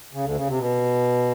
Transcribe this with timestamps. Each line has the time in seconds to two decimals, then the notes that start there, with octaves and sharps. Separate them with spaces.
0.13 C#3
0.24 D2 D3
0.36 C#3
0.47 C3
0.59 B2